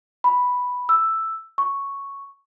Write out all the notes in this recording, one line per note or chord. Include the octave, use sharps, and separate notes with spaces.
B5
E6
C#6